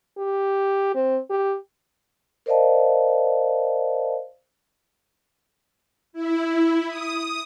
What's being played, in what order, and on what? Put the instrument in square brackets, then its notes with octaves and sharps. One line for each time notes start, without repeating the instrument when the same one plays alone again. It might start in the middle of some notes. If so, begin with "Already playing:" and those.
[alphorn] G4
C4
G4
[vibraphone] A#4 C5 D5 D#5 F5 A5
[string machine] E4
D#6